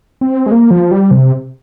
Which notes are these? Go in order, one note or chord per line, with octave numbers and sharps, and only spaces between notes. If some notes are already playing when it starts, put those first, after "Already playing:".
C4
G#3
A#3
F3
G3
C3